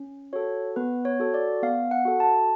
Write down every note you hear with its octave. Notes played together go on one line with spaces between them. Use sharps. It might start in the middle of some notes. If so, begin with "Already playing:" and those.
Already playing: C#4
F#4 A4 C#5
B3 B4
C#5
F#4 A4
D5
B3 F5
F#5
F#4 A4
A5